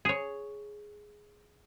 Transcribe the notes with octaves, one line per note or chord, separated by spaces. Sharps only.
G#4 C#5